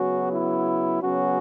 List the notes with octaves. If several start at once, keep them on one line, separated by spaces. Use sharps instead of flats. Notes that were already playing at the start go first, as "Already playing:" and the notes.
Already playing: C#3 F#3 B3 C#4 F#4
E4
C#3 F#3 B3 C#4 F#4